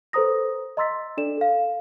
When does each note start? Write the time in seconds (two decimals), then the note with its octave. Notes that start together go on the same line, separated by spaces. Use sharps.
0.13 A4 B4 C5 A#5 D#6 A#6
0.77 D#5 A#5 C6 E6 A6 B6
1.17 D4 A4 D5 E7
1.38 A4 F5